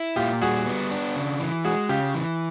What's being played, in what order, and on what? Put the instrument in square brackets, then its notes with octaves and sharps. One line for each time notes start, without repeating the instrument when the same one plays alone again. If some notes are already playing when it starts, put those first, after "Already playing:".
Already playing: [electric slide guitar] E4
[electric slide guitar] A#2 [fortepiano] F4 G4
[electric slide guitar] G3 [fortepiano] F#4 G#4
[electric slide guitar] B3
D4
C#3
E3
[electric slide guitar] G#3 [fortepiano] F#4 G#4
[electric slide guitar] C#3 [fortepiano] F4 G4
[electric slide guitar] E3